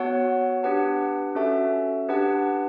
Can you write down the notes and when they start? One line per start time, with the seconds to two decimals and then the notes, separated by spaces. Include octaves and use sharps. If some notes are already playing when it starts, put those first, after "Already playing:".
Already playing: B3 F#4 C#5 F#5 A5
0.63 D4 G4 B4 F#5 A5
1.35 C#4 F#4 A4 E5 A5
2.08 D4 G4 B4 F#5 A5